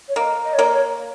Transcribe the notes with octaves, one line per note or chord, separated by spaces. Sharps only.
C#5
A#3 D#5
D#5
C#5
A#3 D#5
C#5